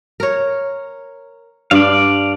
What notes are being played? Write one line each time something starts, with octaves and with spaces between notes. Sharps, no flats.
A#4 C#5
G2 D4 D5 F5